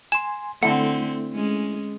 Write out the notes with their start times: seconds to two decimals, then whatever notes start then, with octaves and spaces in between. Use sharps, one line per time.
0.12 G#5 C6 E7
0.63 D3 A3 C4 E4 F#5
1.33 G#3 C#4